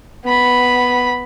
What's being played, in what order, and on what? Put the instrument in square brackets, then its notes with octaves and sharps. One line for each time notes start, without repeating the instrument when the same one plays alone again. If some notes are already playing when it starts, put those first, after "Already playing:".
[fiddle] B3 B5